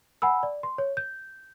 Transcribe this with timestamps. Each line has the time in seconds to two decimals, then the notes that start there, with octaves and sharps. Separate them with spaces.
0.22 F#5 G#5 B5 E6
0.43 D5
0.63 C6
0.78 C#5
0.97 G6